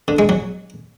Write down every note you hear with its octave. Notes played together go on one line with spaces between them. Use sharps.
D3
G#3
F#3